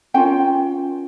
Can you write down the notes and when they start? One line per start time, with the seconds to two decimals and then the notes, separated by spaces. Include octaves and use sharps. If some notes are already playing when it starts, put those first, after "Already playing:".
0.14 C#4 F4 A#4 G5